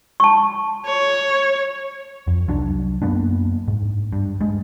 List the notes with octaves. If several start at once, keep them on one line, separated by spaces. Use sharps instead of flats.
A5 C#6
C#5
F2
C2 F#3 D4
F#2 A#3 B3 D4
G#2
G2
G2 G#3